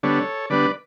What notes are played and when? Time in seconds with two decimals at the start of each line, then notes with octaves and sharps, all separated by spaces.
0.03 D3 G3 B3 D4 A4 C#5
0.50 D3 G3 B3 D4 B4 D5